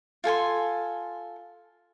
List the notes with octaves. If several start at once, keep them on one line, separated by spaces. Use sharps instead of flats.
F4 A4 G#5 C6